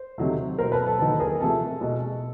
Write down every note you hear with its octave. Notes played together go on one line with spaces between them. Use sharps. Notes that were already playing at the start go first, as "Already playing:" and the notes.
Already playing: C5
C3 D#3 F#3 A3
B2 F#3 A#3 A#4 C5
A4 B4
A4
D#3 F#3 A#3 A4
G#4 A#4
C3 F3 A3 A4
B2 G#3